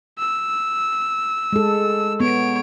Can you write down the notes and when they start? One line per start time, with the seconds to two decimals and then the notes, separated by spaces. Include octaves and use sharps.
0.19 E6
1.53 G#3 A4
2.20 B3 C#5 D7